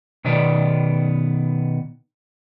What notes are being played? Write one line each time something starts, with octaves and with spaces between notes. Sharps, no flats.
B2 D#3 B3 D5